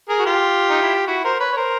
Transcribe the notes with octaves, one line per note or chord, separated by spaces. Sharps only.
G#4 A#4
F#4
F4 G4
D#4
E4
F4
E4 F#4
A#4 C5
B4 C#5
C#5
A#4 C5